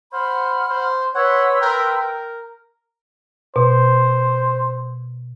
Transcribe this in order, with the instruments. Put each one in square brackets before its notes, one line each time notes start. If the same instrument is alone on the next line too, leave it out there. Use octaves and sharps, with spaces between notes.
[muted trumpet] C5 [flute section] F#5 B5 F6
[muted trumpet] C5
[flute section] B4 C6 E6 [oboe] C#5 [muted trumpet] F#5
[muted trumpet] A#4 [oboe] G5
[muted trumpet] A#4
[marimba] B2 [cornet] C5